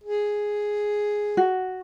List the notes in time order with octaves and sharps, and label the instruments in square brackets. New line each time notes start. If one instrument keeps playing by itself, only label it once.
[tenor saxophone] G#4
[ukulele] F#4